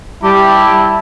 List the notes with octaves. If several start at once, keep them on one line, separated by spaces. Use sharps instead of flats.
G3 E4 G4 A5